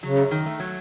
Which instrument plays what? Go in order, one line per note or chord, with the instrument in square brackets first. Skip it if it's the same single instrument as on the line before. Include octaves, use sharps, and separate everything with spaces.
[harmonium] C#3 [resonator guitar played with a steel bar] F#3
[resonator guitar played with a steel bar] F#2
D#3
A3
F#3